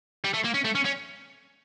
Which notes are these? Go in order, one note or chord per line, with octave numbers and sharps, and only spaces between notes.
G3
A3
A#3
C#4
A3
C#4
C#4